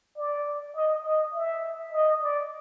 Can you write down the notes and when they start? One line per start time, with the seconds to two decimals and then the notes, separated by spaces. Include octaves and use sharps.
0.17 D5
0.75 D#5
1.04 D#5
1.34 E5
1.92 D#5
2.22 D5